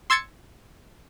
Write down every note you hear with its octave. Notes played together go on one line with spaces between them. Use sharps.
C6 E6 G#6 A6 C#7